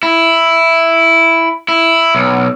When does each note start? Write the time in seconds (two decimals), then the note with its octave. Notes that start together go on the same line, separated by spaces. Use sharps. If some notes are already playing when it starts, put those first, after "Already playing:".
0.03 E4
1.68 E4
2.15 B1